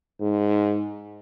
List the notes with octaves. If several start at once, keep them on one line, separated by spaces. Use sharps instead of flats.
G#2